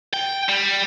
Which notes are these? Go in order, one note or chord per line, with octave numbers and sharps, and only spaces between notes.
G5
G3